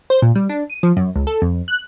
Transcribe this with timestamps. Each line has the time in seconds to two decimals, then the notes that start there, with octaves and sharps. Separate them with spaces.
0.10 C5
0.22 A#2
0.35 G3
0.49 D4
0.70 D#7
0.83 F3
0.97 F#2
1.16 C#2
1.27 A4
1.42 F2
1.68 F#6